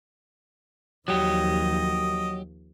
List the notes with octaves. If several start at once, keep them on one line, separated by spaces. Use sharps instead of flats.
D#2 F3 F#3 G4 D#5